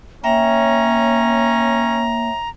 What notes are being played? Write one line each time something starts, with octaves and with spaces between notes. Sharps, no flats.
A#3 C#4 C#5 E5 G5 A#5